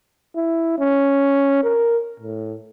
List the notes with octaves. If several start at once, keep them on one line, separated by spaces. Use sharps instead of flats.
E4
C#4
A#4
A2